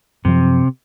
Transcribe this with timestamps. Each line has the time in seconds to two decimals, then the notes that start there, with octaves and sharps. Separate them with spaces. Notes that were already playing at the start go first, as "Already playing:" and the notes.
0.25 F#2 C3 F3